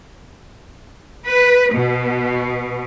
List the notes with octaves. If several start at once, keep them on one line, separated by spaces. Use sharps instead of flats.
B4
B2